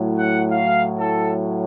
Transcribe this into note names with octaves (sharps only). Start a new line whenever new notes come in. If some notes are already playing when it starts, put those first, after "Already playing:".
Already playing: A2 F#3
F#5
F5
A4